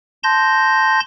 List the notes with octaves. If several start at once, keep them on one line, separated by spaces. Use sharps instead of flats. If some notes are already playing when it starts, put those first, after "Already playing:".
A5 C6 G6 A#6